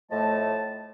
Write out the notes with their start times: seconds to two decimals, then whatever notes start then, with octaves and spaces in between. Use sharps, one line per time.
0.11 A2 F3 A3 D#5 A5